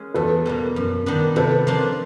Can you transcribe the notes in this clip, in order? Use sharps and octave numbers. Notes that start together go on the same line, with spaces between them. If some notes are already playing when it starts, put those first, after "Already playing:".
Already playing: G#3 A#3 C#4
E2 A4 B4
B2 G3 A#3
F#2
D#3 G3 B3 D4
C3 A4 B4
F3 A#3 D4